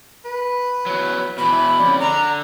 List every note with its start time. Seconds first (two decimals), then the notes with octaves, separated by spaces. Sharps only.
0.25 B4
0.86 E2 F#3
1.38 B2 E3 B5
1.52 E4
1.79 F2 C#3 D5
2.00 D3 A#5